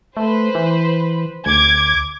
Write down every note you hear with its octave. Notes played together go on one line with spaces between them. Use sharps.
A3 B4 C5
E3
D2 D6 G#6